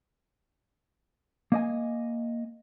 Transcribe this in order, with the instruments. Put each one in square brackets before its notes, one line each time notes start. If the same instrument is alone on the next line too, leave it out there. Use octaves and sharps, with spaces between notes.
[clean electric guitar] A#3 D#5 G#5